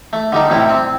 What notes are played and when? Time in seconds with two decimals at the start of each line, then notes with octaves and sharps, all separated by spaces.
0.13 A3
0.32 D3 G3 D#4
0.50 A2 C3 G3 E4
0.69 C4